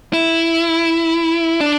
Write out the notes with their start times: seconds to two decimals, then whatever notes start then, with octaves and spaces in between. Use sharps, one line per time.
0.13 E4
1.61 D4